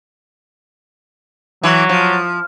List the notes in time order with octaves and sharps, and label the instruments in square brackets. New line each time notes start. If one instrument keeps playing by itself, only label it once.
[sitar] E3 [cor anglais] F#3
[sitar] F3